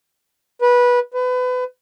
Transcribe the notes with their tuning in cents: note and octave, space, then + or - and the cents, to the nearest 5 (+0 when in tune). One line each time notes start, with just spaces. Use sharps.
B4 -15
B4 +30